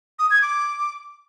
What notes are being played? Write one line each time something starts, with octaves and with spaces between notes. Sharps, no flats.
D#6
G#6
D6